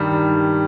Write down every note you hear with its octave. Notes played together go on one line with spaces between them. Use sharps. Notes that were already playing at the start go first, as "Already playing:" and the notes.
Already playing: G2 D#3 G3